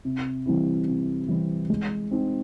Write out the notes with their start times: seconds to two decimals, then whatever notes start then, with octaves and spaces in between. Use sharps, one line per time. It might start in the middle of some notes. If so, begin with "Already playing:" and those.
0.05 C3
0.46 E3 G3 C4 E4
0.87 C3
1.28 E3 G3 C4 E4
1.70 G#3
2.11 C4 D#4